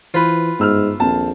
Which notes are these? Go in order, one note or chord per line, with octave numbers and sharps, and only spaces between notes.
E3 F4 B4 C5
G1 G#2 E6 F6
D#1 A#1 C4 A5